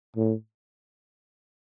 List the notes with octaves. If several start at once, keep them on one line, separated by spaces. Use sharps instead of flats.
A2